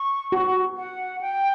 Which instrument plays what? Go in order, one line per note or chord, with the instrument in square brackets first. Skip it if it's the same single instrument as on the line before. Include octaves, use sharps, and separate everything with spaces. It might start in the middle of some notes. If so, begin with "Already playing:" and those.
Already playing: [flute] C#6
[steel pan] F#4
[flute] F#5
G5